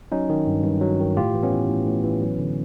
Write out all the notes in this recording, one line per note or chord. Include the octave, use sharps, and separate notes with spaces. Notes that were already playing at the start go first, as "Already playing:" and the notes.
F#3 C#4 D#4
D#3
G2
G2
F#3
D#3
A2 F4 G4
E3
B3 C#4
E3
A2
A2
E3
F#3
D3